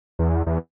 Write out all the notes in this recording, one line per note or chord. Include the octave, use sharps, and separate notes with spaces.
E2
E2